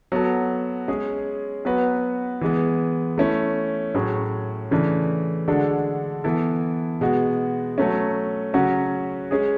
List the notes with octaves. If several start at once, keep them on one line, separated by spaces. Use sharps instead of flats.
F#3 B3 F#4 A4
G#3 C#4 G#4
F#3 B3 F#4 B4
E3 G#3 B3
A3 C#4 E4
A2 F#3 C#4 G#4
C#3 E3 A3 D4
D3 G#3 D4 F#4 A4
E3 B3 E4 A4
B2 G#3 B3 F#4
F#3 A3 C#4
C#3 F#3 C#4 F#4
G#3 C#4 G#4